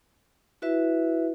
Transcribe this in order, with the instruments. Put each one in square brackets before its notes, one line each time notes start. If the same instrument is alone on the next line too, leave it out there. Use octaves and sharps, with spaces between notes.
[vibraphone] E4 F#4 B4 E5